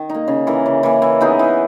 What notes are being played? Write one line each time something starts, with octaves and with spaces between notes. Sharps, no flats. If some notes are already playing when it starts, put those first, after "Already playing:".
Already playing: D#3
A#3 D#4
C#3
E3 A#3
C#3
E3 A#3
E3
B3 D#4 G#4
E3